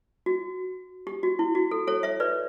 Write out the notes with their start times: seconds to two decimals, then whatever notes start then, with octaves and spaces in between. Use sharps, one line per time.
0.26 F#4
1.07 G4
1.23 F#4
1.39 E4
1.55 F#4
1.71 A4
1.87 A4 C#5
2.03 C#5 E5
2.20 B4 D5